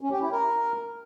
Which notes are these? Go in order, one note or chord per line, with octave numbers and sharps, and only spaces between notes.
C#4
G4
E4
A#4